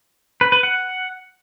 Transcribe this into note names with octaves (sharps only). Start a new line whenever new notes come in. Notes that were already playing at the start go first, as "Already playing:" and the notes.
B4
B4
F#5